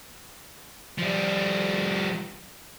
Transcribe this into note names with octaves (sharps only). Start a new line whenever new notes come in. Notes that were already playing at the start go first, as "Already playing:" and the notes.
F3 G3